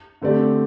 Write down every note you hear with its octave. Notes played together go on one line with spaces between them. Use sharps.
D3 A3 C4 G4 D5